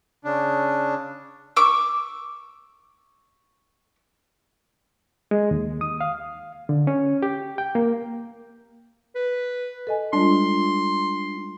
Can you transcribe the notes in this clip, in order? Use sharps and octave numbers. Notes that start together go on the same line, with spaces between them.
C#3 D4
C#6 D6 E6
G#3
D#2
D#6
F5
D3
C#4
G4
G5
A#3
B4
A4 D#5 G#5
G3 G#3 D4 F4 C6